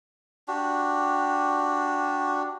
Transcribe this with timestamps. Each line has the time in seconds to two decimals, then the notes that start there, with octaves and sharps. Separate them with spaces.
0.48 D4 F#4 G4